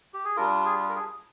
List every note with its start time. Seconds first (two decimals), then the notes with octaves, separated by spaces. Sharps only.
0.14 G4
0.25 G#4
0.36 G3 D4 F4 A#4
0.66 G#4
0.90 A#4
0.96 G#4